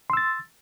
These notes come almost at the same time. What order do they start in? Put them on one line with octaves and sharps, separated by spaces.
C6 E6 A6